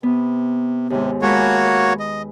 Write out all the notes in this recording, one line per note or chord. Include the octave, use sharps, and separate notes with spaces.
C3 B3
D#2 G#2 C3
G#3 A#3 F#4 C#5 A5 B5
B4
D#5